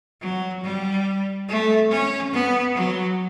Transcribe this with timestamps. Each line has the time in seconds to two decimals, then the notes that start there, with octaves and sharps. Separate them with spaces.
0.21 F#3
0.63 G3
1.49 A3
1.90 C#4
2.32 B3
2.75 F#3